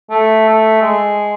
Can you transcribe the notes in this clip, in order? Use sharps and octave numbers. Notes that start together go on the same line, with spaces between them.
A3
A3
G#3